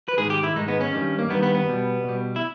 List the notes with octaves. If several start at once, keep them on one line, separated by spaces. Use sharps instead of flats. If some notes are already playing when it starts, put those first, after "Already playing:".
B4
G#2 D#3 G#3 G#4
G4
E4
G#2 D#3 G#3 D#4
B3
C#4
G2 D#3 G3
A#3
G2 D#3 G3 B3
B3
B3
B2 G3
B2 G3
E4